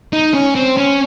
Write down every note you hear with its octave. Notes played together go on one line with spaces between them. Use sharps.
D#4
C#4
C4
C#4